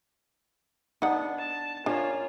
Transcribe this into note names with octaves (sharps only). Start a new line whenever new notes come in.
B3 D4 D#4 F#5
A5
A#3 C#4 D4 F4 C#5